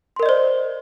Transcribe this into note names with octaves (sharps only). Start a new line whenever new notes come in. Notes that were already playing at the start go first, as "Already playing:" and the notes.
A#4 C5 D5 D#5 C6